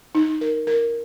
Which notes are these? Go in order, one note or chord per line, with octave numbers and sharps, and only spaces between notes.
D#4
A#4
A#4